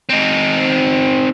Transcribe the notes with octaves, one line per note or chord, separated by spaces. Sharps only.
C4 D#4